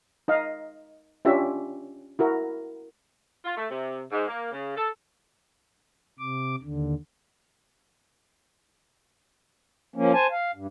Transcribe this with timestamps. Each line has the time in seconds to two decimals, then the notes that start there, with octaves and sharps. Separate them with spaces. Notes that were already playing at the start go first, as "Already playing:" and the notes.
0.28 D#4 D#5 F5
1.25 C#4 D4 F4 G4 C#5 E5
2.19 E4 F#4 A#4
3.45 F4
3.56 A3
3.70 C3
4.12 G#2
4.27 A#3
4.52 C#3
4.76 A4
6.19 C3 D6
6.62 D#2 D3
9.96 F3 A#3 C#4
10.14 C5 G#5 A5
10.31 F5
10.55 G2